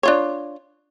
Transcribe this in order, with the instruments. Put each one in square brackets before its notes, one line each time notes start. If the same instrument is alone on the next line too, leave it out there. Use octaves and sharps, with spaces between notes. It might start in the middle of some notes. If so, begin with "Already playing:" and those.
[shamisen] D4 F4 C#5